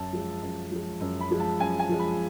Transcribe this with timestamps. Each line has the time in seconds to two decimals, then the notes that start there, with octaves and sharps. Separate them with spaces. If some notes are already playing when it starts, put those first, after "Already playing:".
Already playing: F#2 A5
0.13 F3 G#3
0.42 F#2
0.71 F3 G#3
1.00 F#2
1.21 B5
1.31 F3 G#3
1.40 A5
1.60 F#2 G#5
1.79 G#5
1.89 F3 G#3
1.99 B5